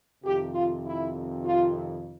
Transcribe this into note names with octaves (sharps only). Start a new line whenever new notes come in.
F2 C3 D#3 G4
F4
E4
F4